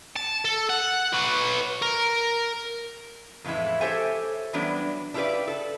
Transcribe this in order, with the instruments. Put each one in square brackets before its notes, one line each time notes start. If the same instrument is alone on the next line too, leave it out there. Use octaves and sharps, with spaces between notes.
[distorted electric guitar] A5
A4
F#5
B4 C#5
A#4
[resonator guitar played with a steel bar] F2 A2 E3 G#3 E4
G4 A4 C5 C#5 E5 G#5
E3 F#3 G3 B3 D4
D4 E4 F4 G4 B4 D5
A4 B4